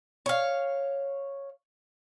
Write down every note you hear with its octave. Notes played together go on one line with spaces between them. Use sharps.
C#5 F5